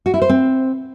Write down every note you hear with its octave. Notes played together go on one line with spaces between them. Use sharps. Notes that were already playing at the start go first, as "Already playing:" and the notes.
F#4
E4
C5
C4